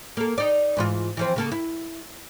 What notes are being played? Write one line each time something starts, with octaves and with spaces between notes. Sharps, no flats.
A#3 A4
D#4 D5
G#2 E3 F4
E3 F3 C4
C#3 A#3 A4
E4